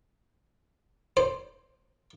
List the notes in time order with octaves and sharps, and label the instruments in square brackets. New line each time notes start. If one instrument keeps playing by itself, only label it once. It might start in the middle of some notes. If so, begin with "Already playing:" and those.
[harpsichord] C5